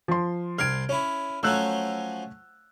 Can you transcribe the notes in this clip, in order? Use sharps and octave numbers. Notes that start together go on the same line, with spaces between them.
F3 C6
C2 C6 F6 G#6 D7
C#4 E4 C#5
F3 F#3 A3 C#4 E6 F#6